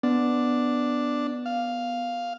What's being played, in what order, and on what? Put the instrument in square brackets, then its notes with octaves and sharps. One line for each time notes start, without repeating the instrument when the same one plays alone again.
[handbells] B3 [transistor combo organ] D4
[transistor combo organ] F5